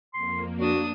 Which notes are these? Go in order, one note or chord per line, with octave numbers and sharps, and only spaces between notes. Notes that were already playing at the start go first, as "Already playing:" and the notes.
F2 A#3 C6
D4 F#4 D#6